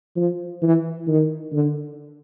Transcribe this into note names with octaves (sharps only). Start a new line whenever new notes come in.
F3
E3
D#3
D3